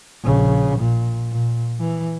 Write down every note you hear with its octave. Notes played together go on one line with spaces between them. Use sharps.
A#1 C#3
A#2
A#2
E3